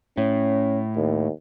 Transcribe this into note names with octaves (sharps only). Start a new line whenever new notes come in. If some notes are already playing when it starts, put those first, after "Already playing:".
A2 C#4
D#2